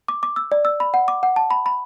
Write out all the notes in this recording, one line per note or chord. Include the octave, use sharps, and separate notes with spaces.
D6
D6
E6
D5
E6
B5
F#5
D6
F#5
A5
B5
B5